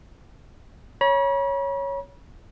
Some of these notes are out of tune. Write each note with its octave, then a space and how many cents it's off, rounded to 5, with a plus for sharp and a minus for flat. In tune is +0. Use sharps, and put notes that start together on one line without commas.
C#5 +0 B5 -45